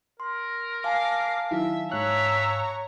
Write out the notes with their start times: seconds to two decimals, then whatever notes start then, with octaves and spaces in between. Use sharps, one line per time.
0.20 A#4 C6
0.84 F5 G#5 A5 D6 C7
1.51 D#3 F#3 E4 E5
1.92 G#2 C#5 E5 A#5 F#6